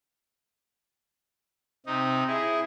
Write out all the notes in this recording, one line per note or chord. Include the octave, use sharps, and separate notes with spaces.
C3 D#4
E4 G#4